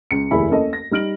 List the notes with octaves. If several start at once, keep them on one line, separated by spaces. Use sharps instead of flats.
C#2 C#7
F1 D#2 E4 G#4 B5
A#3 C#4 A4 D#5
A#6
G3 D#4 F6 D7 F#7